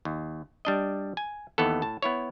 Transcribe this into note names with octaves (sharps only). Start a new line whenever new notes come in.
D#2
G3 D4 D#5
G#5
D#2 E3 B3 A4
A2 A5
B3 E4 C#5